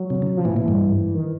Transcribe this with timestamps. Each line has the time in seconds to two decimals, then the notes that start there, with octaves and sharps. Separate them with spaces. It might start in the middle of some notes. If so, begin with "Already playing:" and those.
Already playing: F#3
0.10 C3
0.22 C#3
0.37 F3
0.45 A2 E3
0.56 A#2
0.68 G2
1.14 D#3